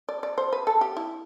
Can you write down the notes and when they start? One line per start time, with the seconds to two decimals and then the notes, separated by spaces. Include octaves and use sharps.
0.09 D5
0.23 D5
0.38 C5
0.53 B4
0.67 A4
0.81 G4
0.97 E4